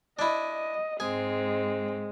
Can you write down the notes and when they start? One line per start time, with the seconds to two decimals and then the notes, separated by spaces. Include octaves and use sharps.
0.19 D4 E4 D#5
1.00 G#2 G#3 C4 G#4